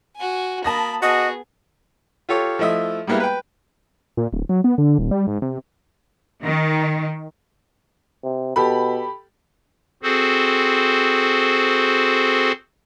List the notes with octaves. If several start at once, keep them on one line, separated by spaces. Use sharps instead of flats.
F#4 G#5
A#3 A5 B5 D#6 A#6
B3 F#4 G#4 D#5
F4 G4 A4 C#5
F3 A3 E4 D#5 E5
G3 G#3 A#3 B3 E4
B4 G5
A#2
D1
F#3
B3
D3
D#1
G3
G#2
C3
D#3
C3
B2 G4 A4 B5
C4 F#4 G#4 A4 C5